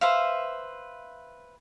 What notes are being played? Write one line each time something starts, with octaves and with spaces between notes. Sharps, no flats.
B4 C5 E5 F5